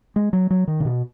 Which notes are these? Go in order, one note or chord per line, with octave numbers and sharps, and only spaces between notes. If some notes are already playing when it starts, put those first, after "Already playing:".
G#3
F#3
F#3
D#3
C#3
B2